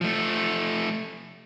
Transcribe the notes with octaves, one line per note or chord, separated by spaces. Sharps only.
F3 A3